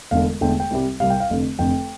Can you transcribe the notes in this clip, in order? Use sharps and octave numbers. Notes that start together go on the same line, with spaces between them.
E1 E2 D3 A3 F5
E1 E2 D3 A3 G5
G5
C2 C3 G3
C2 C3 G3 F5
G5
F5
F1 F2 D3
F1 F2 D3 G5